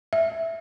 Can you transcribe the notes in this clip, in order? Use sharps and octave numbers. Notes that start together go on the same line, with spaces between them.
E5